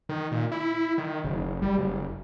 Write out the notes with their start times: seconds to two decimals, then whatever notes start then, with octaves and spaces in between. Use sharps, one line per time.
0.09 D#3
0.31 A#2
0.52 E4
0.98 D#3
1.24 F#1
1.62 G3
1.78 F#1